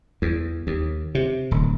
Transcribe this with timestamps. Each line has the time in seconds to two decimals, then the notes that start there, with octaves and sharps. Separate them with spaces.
0.22 E2
0.67 D#2
1.15 C3
1.51 D1